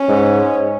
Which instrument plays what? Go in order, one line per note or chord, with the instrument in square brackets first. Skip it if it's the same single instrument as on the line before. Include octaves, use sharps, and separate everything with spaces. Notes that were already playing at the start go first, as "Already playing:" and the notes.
Already playing: [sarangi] C#4
[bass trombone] G#2